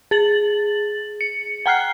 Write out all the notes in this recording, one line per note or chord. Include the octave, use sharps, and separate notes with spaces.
G#4 A6 F#7
C#7
F#5 G5 A#5 F6 F#6 C7